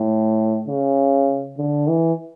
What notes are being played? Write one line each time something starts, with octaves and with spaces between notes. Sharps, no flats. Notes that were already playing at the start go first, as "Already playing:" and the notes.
Already playing: A2
C#3
D3
E3